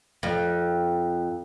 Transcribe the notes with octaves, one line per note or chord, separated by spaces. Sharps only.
F2